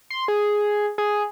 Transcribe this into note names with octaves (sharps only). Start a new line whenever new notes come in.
C6
G#4
G#4